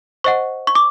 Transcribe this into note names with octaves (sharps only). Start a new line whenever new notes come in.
C5 D#5 F#5 C#6
C#6
D6